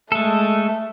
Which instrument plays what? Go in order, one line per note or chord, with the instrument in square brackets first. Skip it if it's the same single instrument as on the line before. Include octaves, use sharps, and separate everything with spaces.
[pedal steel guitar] G#3 A4 [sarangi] A3